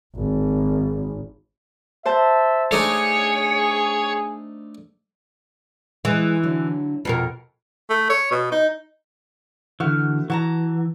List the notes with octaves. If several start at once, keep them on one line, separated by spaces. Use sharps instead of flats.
G#1
C5 E5 A5
A3 D4 D#4 G#4 C#5
E3 G#3
D3 F#3 D4
F2 B2 A#4 B4
A3
C#5
B2
D#4
D3 E3 A3 F#4 F6
E3 F#4 A5 A#5